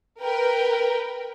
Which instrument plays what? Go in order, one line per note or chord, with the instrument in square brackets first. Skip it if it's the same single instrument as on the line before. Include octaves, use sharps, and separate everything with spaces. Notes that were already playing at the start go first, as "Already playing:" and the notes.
[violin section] A#4 B4 G5